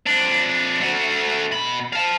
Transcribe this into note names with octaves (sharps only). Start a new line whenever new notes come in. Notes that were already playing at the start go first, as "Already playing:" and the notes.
F2 D4
A3 F#4
B2 B5
F5 A5